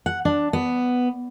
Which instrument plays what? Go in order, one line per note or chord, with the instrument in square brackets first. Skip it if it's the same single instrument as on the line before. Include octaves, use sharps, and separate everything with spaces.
[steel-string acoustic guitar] F#5
D4
B3